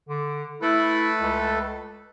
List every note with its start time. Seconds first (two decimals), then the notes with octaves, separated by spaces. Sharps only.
0.09 D3
0.62 A3 E4 A4 B4
1.20 C#2